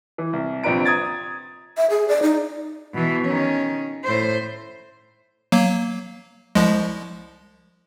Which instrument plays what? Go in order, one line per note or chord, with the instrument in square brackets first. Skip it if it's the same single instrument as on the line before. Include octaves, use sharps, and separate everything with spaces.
[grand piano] E3
C2
A#1 C3 D4 B4 A#5 D7
A#5 D#6 G#6 A6
[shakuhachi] E5
G#4
D5
D#4
[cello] B2 E3
D#3 C#4
A2 C5
[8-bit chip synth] F#3 A#3
C2 F3 G#3